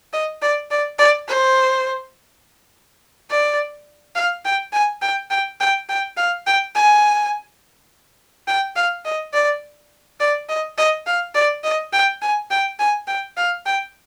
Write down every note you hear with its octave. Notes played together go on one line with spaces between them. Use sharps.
D#5
D5
D5
D5
C5
D5
F5
G5
G#5
G5
G5
G5
G5
F5
G5
G#5
G5
F5
D#5
D5
D5
D#5
D#5
F5
D5
D#5
G5
G#5
G5
G#5
G5
F5
G5